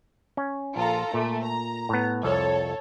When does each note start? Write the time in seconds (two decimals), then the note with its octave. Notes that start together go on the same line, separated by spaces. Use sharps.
0.37 C#4
0.76 A#1 F4 A4 A#5
1.14 A#2 A3
1.44 A#5
1.89 A2 B3
2.23 C2 F2 A4 C#5